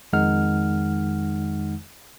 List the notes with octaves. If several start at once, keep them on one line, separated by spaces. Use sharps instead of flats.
F2 D#3 G#3 D#4 F#5 F6